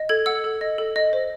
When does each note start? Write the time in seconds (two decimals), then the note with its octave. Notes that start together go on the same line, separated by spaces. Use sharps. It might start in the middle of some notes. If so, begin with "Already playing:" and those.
Already playing: D#5
0.09 A4 G#6
0.26 F#5 E6
0.44 A4
0.61 D#5
0.78 A4
0.96 D#5
1.13 C5